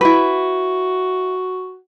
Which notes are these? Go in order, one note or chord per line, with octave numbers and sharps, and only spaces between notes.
E4 F#4 B4